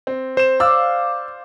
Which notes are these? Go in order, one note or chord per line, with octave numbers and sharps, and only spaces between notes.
C4
C5 E7
D5 F5 E6